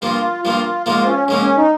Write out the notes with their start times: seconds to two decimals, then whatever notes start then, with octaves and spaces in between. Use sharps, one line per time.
0.02 G2 F3 A#3 F4
0.45 G2 F3 A#3 F4
0.86 G#2 F3 A#3 F4
1.03 C4
1.07 C#4
1.28 G#2 F3 A#3 C#4
1.42 C#4
1.56 D#4